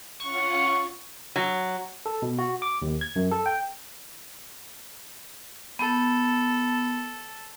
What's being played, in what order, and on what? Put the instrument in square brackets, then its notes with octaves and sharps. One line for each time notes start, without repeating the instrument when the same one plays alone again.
[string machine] C#4 F4 F#5 [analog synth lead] C#6
[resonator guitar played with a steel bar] F#3
[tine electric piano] A4
B2
F#4
D6
D#2
G#6
F#2
A4
G5
[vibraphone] B3 [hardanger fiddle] A4